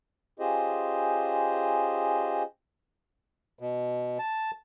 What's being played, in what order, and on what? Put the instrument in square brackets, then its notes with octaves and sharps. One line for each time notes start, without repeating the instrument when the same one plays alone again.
[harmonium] C#4 F4 G4 G#4 C5 D#5
[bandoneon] B2
A5